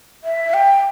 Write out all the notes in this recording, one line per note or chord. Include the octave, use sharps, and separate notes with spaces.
E5
G5